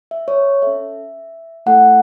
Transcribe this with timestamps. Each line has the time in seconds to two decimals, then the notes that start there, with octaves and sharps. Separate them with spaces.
0.11 E5
0.28 C#5
0.62 C#4 A4 E5
1.66 A3 E4 A4 F#5